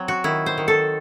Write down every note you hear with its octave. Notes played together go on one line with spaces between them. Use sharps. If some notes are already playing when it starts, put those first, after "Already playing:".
Already playing: F#3 C4
F#4
D#3 E4
C5
D#3
A4